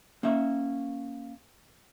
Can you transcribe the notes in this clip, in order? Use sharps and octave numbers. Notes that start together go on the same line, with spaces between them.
A#3 C#4 E5